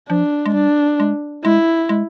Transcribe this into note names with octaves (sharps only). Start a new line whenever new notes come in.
F3 D4
G#3
G3 D4
G#3
G#3 E4
G#3